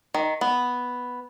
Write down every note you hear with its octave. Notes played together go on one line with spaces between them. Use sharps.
D#3
B3